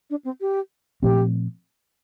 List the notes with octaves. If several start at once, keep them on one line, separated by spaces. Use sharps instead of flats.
D4
C4
G4
A#2 F3 A3 C4 G4